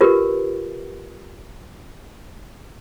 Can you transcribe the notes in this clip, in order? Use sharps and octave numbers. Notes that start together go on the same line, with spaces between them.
F4 G4 A#4 B4